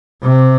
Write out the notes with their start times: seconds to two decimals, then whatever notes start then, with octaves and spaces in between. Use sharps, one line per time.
0.24 C3